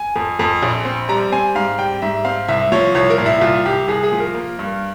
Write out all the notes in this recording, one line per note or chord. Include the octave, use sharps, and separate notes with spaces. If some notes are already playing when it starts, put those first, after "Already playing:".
Already playing: G#5
F2
F2
A#1
C4
G3 A#5
C4 G#5
G#2 F5
G3 G5
G#2 E5
C4 F5
C2 E5
F3 C#5
C2 C#5
A#4
A#2
E4
C2 F4
C2 G4
C2 G#4
G#4
F3
A#4
A#3
G2